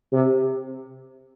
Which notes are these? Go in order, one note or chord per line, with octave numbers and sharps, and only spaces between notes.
C3